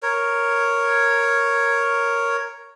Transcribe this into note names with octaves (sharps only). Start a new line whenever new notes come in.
A#4 C#5